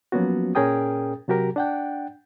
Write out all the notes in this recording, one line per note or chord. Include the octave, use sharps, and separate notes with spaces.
F3 F#3 A#3 B3 C#4 F#4
A#2 C#4 G#4 A#4 G5 D#6
C3 F#3 F#4 G4 A#4
D4 F#5 G5